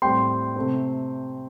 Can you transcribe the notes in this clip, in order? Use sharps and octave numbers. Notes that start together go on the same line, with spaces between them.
A2 G3 C4 G5 C6
C3 A3 C4